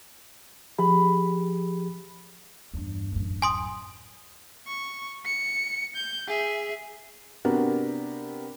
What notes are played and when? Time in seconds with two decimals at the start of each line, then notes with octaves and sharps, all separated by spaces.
0.78 F3 G4 G#4 B5
2.74 E2 G2
3.12 D1 F#2
3.42 G#5 C6 D#6
4.68 C#6
5.25 C#7
5.96 G6
6.28 G#4 E5
7.45 C3 B3 D4 F#4 G4 A#4